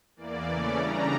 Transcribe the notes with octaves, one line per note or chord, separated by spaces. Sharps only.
E2 E3 A#3 D5
C#3 E3 A3 C#4 D5
C#3 G3 D4 A#5